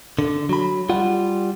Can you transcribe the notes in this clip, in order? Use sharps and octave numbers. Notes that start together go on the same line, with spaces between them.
D3
F#3 B5
G3 F4 F#5